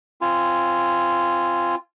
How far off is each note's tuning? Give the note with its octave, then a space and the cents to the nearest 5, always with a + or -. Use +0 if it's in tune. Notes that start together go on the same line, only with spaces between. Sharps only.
C4 +0 F4 -15 G#5 +0